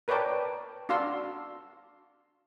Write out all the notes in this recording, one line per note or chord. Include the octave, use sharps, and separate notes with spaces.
A#4 B4 C#5 D5 G5 A5
D4 F#4 F5 C6 E6